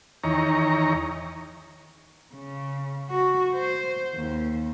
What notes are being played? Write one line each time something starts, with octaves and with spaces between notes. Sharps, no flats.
E2 D#3 C#5 A#5
C#3
F#4
C5
D#2